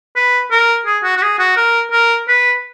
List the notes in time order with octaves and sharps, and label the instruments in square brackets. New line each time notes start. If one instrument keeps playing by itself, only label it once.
[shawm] B4
A#4
G#4
F#4
F#4
G#4
F#4
A#4
A#4
B4